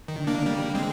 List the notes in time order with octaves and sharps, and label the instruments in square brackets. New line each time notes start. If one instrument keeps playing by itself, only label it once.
[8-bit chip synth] D#3
[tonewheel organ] D3
[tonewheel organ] D#3 [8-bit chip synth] A#3 D4
[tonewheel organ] D3 [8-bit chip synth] G3 A#3
[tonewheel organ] D3
[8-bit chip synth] G#3 C4